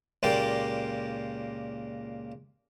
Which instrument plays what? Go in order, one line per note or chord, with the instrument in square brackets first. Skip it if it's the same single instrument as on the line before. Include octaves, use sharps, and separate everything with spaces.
[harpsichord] C#2 A#2 A#3 G4 D5 G5